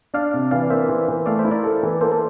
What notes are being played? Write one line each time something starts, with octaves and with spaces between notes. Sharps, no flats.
D4 D5 F5
C3
E3 D5 F5
A#3 C5 E5
E3
E3
A3 D5 F5
C5 E5
E4
A#4 D5
A4
E3
A#3 A4 C5
A4